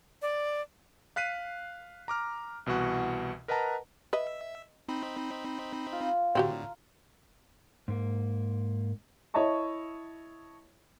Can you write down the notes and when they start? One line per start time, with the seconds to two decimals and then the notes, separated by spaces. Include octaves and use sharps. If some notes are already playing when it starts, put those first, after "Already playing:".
0.22 D5
1.16 F5 F#6 B6 C7 D#7
2.08 A#5 D6 F6
2.66 C2 B2 E3 F#4 F#5
3.48 A#4 B4 D#5 F#5 A5 A#5
4.13 B4 D#5 E5
4.89 C4 D#4 B5
5.92 F4
6.35 A2 D3 C4 F#4 G4 A#5
7.88 G#2 A#3
9.34 E4 C#5 D#5 E5 A5 C#6